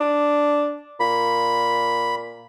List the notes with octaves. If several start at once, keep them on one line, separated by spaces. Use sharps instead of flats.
D4
A#2 B5